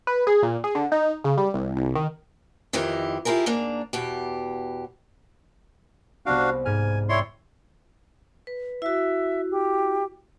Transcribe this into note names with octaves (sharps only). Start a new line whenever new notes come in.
B4
G#4
A#2
G#4
D3
D#4
C#3
G3
C2
C2
D#3
F2 D#3 E3 E4 G4
E4 F4 G4 G#4 A#4
G#2 A#3 D4 A#5
E2 B2 G4
C2 B3 D4 F#4 F5 D7
G#2 G#5 F6
E4 C#5 D5 G5 C6 E6
B4
E4 F#4 E5
G4